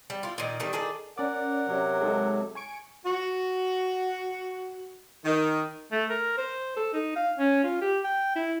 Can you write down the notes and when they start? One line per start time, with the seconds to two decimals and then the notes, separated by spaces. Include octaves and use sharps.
0.10 G3
0.23 E4 F4
0.38 A#2 D#3
0.60 D#3 G3 A3 D#4
0.73 D#3 G#4 A4 D5
1.18 C#4 A#4 D5 F#5
1.68 C3 F#3
2.01 G#3 D#4 A4
2.55 G#5 C#6 D7
3.05 F#4
5.24 D#3
5.92 A3
6.10 A#4
6.37 C5
6.76 A4
6.93 D#4
7.16 F5
7.38 C#4
7.63 F4
7.81 G4
8.04 G5
8.35 E4